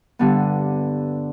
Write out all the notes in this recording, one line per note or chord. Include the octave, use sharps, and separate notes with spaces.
G2 D3 G3 B3